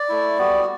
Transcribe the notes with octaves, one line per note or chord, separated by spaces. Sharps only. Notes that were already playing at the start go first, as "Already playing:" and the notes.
Already playing: D5
A3 E4
G3 B3 F#4